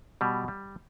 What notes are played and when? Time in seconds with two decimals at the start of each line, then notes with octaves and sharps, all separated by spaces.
0.21 B2 G3
0.48 G3